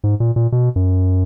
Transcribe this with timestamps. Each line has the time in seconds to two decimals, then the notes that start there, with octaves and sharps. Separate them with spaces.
0.04 G#2
0.20 A#2
0.36 A#2
0.52 B2
0.76 F#2